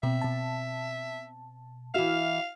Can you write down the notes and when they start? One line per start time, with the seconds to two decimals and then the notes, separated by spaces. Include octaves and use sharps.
0.03 B2 C4 E5
0.22 B2 A5
1.94 E3 F#4 E5 F5 F6